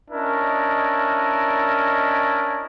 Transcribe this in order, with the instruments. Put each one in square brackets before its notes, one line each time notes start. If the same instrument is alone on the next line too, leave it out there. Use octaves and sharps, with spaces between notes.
[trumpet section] C#4 D4 E4 A#4 D#5